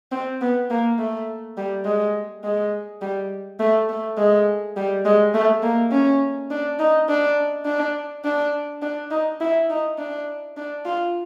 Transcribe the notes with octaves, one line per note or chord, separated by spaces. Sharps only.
C4
B3
A#3
A3
G3
G#3
G#3
G3
A3
A3
G#3
G3
G#3
A3
A#3
C#4
D4
D#4
D4
D4
D4
D4
D#4
E4
D#4
D4
D4
F4